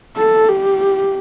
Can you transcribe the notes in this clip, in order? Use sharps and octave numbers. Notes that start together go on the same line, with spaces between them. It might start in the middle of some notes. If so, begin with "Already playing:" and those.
A4
G4